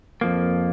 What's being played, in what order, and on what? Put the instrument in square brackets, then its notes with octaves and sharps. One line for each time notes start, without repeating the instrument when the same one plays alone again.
[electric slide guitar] F2 F3 A#3